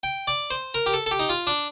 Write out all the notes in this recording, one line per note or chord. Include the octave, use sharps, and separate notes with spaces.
G5
D5
C5
A#4
G4
A4
A4
G4
D#4
F4
D4